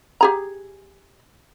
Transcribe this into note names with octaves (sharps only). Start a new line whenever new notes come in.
G4 G#4 A#5